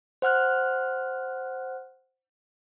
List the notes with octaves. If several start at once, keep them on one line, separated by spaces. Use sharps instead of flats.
C5 F#5 F6 F#6